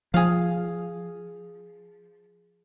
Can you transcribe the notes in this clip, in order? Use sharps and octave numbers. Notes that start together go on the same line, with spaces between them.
F3 G#4 F5